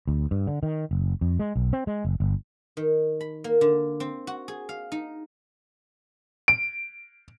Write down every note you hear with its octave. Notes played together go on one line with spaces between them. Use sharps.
D2
G2
D3
D#3
F#1
F2
G#3
B1
C4
G#3
F#1
G1
D#3
B5
A#3
D3
C4
F#4
G#4
F5
D#4
D7